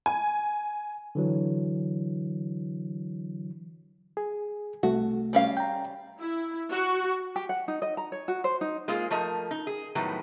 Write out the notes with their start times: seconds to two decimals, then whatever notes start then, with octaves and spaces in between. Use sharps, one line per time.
0.06 G#5
1.15 D3 E3 F#3
4.17 G#4
4.83 C2 C3 A3 F#4
5.33 G3 C#4 F5
5.57 G5 A#5
6.20 E4
6.72 F#4
7.36 G4
7.49 F#5
7.68 D#4
7.82 D#5
7.97 A#5
8.12 C#5
8.28 F#4
8.44 C5
8.61 D#4
8.88 G#3 A#3 F4 G#4
9.10 F3 A3 A#4 D#5
9.51 D#4
9.67 G#4
9.95 A2 D#3 F#3 G3 B3